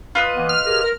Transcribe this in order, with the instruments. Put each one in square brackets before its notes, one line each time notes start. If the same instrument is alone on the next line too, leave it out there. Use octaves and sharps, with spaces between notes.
[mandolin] F4 B4 D#5
[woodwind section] E3 A#3 B3
[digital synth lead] F6
[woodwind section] G4 G#4 A#4
A#4